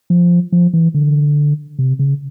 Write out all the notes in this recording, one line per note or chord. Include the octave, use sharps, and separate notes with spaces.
F3
F3
E3
D3
C3
C#3